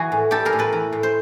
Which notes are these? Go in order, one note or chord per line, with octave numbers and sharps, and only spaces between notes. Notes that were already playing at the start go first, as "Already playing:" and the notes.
Already playing: E3 F#4 G#4
A2
G3 G4 A4
G#4 A#4
A2
A4 B4
E3
A2
C5